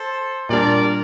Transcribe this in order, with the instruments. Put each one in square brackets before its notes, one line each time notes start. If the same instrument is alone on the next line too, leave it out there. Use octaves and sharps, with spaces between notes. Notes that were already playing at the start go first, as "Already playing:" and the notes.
Already playing: [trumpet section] A4 C5
[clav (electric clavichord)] A#2 G3 D4 [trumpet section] A#4 D5